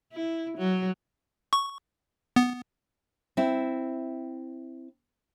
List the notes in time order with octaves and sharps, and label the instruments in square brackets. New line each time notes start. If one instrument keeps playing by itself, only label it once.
[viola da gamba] E4
F#3
[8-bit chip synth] C#6
B3
[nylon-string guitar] C4 E4